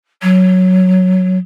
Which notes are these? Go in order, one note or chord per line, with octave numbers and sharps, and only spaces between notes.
F#3